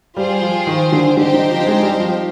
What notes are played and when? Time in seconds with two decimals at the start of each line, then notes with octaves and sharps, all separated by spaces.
0.16 G3 F4 G#4 C5 G5
0.42 F3
0.67 D#3
0.92 D3
1.16 D3 C4 D#4 G4 C5 G5
1.34 D3
1.50 F3
1.66 G#3
1.83 G3
2.00 F3